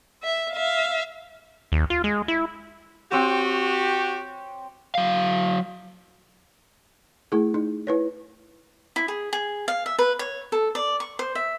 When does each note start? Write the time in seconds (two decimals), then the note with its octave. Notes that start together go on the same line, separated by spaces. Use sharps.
0.23 E5
0.53 E5 F5
1.72 D#2
1.90 F4
2.04 G#3
2.28 E4
3.12 C4 F#4 G4 C#5
4.95 F#3 F5
7.32 A3 E4 G#4
7.54 D#4
7.87 E4 B4 C#5
8.96 E4
9.08 G#4
9.33 G#4
9.68 F5
9.86 E5
9.99 B4
10.19 C#5
10.52 A4
10.75 D5
11.00 C#6
11.19 C5
11.35 E5